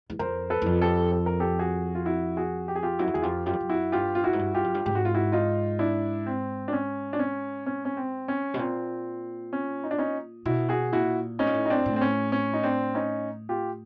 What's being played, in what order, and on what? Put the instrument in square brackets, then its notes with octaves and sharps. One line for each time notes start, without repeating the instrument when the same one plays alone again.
[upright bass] E2
[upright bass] F2 [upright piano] A#4 C5
[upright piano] A4 B4
[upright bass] E2
F2
[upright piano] G4 A4
A4
A#4
G4 A4
F#4 G#4
F4
E4 F#4
F#4 G#4
G4
G#4
F4 G4
[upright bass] F#2 [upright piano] E4 F#4
[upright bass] F2
[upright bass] E2 [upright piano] G#4
[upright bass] F2 [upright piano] F4 G4
[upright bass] F#2 [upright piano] F4 G4
[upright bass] F2
F#2
[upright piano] E4 F#4
[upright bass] G2 [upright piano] F4 G4
[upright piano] F4
E4 F#4
[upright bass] G#2
G2
[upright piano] F4 G4
[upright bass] F#2
G2
[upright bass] G#2 [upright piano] G4
[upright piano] F#4
F4
E4 F#4
D#4 F4
D4 E4
C4
D4
C#4
D4
C#4
C#4
C#4
C4
C#4
[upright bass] B2
[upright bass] A#2 [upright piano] C4
[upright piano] C#4
D#4
D4
C#4 D#4
[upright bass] B2 [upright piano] E4 F#4
[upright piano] F#4 G#4
[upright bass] A#2 [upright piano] E4 F#4
[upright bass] A2 [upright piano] C#4 D#4
[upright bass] A#2
A2
[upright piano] D#4
C4 D4
[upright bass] A2
[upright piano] C4
C#4
C#4
D#4
C4 D4
C#4 D#4
F4 G4